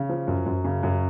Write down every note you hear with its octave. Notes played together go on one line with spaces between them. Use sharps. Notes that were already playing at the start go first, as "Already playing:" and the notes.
Already playing: C#3
F3
F#2
F#2
C#3
F#2